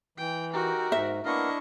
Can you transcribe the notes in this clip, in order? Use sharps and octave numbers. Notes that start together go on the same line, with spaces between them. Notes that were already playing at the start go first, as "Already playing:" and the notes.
E3 G5
D#4 F#4 G4 A#4
G#2 E5
A#3 B3 D4 E4 D#5 F5 C#6